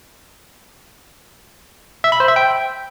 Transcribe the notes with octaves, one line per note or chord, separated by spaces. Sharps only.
E5
B5
C5
E5
G5